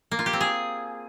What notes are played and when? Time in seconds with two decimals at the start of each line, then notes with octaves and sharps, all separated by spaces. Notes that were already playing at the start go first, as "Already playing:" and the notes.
0.11 A#3
0.19 F4
0.26 G4
0.33 C4
0.41 G#4